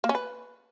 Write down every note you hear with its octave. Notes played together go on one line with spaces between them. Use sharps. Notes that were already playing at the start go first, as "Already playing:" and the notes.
A#3
C#4
B4